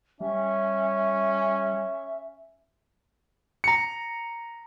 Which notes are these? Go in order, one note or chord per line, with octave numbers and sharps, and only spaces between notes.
G3 C#4 E5
A#5 C#7